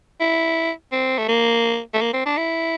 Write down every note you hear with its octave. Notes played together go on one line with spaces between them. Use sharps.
E4
C4
A3
A#3
A3
A#3
C4
D4
E4